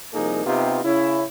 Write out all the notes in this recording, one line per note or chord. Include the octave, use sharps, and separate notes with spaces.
C2 F3 A#3 D#4 G#4
C3 B3 D#4 F4 G4
C#3 C#4 E4